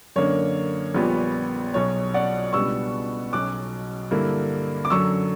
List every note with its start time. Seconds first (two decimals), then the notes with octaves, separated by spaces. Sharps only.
0.16 F#2 D3 A#3 D4 C#5
0.95 A#1 A#2 G3 B3
1.74 B1 B2 F#3 C#5
2.14 D5 F#5
2.53 C#2 B2 G3 B3 D4 C#6 E6
3.32 B1 B2 F#3 C#4 D6 F#6
4.11 G2 D3 A#3 E4
4.85 D6
4.90 F#2 D3 F#3 C#6 E6